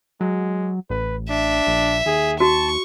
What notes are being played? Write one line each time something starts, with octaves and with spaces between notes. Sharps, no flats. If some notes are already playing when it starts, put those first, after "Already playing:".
F#3 G#3
A1 B4
D4 E5
A#1
D#2 G#4
F#4 A5 C#6